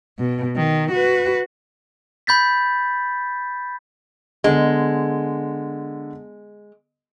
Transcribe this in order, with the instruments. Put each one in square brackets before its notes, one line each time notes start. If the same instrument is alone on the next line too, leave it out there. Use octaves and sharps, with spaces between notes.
[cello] B2
D#3
F#4 B4
[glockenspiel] B5 G6 A6 B6
[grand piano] D3 B3 [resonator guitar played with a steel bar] G#3